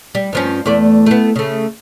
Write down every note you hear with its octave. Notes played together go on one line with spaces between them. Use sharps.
G3
G2 F3 C#4
E2 A3 D5
A3 B3
C#3 A3